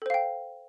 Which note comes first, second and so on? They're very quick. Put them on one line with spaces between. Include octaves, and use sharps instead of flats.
A4 C5 F5 G5